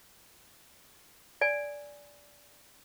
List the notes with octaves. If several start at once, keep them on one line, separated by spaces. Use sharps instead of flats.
D5 G#5